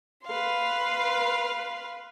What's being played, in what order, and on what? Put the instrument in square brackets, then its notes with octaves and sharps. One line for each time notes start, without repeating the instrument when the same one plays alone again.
[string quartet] B4 F5 C6